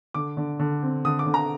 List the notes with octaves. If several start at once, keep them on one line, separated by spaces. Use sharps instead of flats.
D3 D6
D3
D3
C4
D3 D#6
D6
D3
A#5